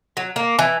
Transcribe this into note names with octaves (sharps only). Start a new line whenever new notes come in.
F#3
A#3
E3